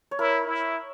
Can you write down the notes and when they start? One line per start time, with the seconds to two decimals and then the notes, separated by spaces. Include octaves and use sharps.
0.11 C#5
0.19 E4 A#4
0.47 E4